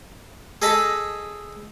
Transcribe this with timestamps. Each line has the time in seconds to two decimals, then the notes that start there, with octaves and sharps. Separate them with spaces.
0.62 G#4 A4 D#5 A5 B5